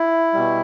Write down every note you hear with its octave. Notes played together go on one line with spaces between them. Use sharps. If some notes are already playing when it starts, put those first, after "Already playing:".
Already playing: E4
B2 G3